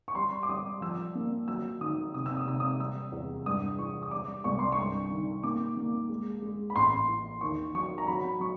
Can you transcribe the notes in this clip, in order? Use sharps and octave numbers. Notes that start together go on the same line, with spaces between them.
C#6
G3 C6
D6
G3 D#6
F3 E6
A#3
F#3 E6
D#3 D#6
C3 D#6
E6
D#6
C3 E6
D#6
G3 E6
E2
G2 D#6
E3 C#6
D#6
G3 D6
C2 C#6
C6
C#6
G2
D#3
A#3 D6
A#3
G#3
G#3
B5
A1 C6
E3
D#2 C#6
F#3 C#6
A#5
F#3 B5
F#3 C#6